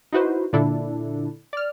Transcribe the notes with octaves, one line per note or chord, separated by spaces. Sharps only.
D#4 E4 F#4 B4 C5
A#2 D3 D4 E4 A4
D5 F6